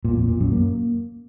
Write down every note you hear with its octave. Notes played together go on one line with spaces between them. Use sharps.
A#2
F2
A#2
F#2
A#3